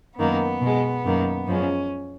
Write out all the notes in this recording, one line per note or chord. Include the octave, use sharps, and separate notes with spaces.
F#2 D#3 A#3 B3
B2 G#3
F#2 D#3 A#3
F#2 F3 G#3 C#4